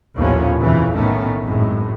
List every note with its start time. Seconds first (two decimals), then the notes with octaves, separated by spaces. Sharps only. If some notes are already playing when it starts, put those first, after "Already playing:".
0.15 A#1 D#2 A2 F3 B3 C#4
0.62 B1 F2 C#3 E3
0.94 A2 D#3 A3 B3 C#4
1.42 G#1 F#2 A2 G#3